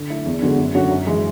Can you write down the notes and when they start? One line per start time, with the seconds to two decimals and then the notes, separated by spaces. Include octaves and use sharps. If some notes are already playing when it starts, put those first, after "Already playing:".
Already playing: D3
0.10 A3 E4
0.26 E2
0.42 D3 G#3 B3 F#4
0.58 F#2
0.74 D3 F#3 C#4 F#4
0.91 F#2
1.07 E3 G#3